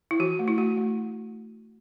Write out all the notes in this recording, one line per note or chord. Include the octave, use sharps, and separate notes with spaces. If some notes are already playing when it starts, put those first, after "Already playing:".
E4
E3 F#4
A3
E4
A3 F#4
A3